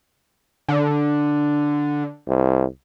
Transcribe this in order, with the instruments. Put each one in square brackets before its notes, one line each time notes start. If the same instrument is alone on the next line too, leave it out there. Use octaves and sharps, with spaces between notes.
[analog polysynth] D3
[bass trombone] C2